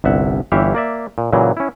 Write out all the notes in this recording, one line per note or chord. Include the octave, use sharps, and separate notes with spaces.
G1 C2 E5 F#5
G1 E3 G4 C#5 E5 F5
A#3 D5 E5
A#2
A#2 C#3 E3 F#3
C#4 E4